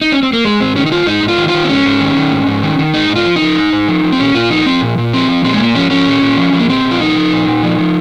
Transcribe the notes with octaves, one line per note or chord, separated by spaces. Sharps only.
D#4
C#4
C4
A#3
G#2 G#3
G#2 C4
D#3 C#4
D#4
D#3 F4
G#2 D#4
G#2
F4
D#3
F4
D#3
C4
G#2 C#4
G#2
D#3
D#3
G#2
G#2
D#3
D#3
G#2 D#4
G#2
F4
F3
D#4
F3
G#2
G#2
F3
F3
C4
A#2 C#4
A#2 F4
F3 D#4
F3 C4
A#2
A#2
F3 C4
F3
A#2 C4
G#3
A#2 A#3
F3 C#4
F3 C#4
A#2
A#2
F3
F3
A#3
A#2 C4
A#2
F4
F3 D#4
F3
A#2
A#2
F3
F3